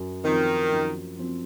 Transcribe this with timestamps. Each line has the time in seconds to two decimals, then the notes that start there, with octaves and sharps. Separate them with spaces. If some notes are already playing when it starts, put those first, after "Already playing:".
Already playing: F#2
0.24 D#3 F3 C4
0.71 F#2
1.18 F3 C4